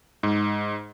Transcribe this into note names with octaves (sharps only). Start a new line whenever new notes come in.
G#2